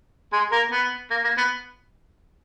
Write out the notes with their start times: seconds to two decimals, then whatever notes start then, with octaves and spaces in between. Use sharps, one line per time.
0.33 G#3 G#4
0.52 A#3 A#4
0.71 B3
1.11 A#3
1.24 A#3
1.38 B3